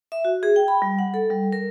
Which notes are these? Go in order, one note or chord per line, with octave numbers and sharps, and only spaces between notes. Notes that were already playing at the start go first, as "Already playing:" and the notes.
E5
F#4
G#4
G5
B5
G3
F#5
A4
G3
A#4